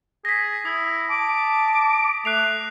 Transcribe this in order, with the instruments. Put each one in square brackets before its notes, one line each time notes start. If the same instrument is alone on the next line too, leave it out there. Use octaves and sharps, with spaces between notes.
[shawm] G#4 [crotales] A#6 B6
[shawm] E4 [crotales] D#6
[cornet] A5 [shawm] D6
[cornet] A3 [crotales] F#6 C7 F7